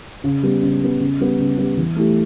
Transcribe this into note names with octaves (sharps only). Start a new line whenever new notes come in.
C#3
G3 B3
C#3
G3 B3
C#3
G3 B3
C#3
G3 B3
E3
A3 E4 G4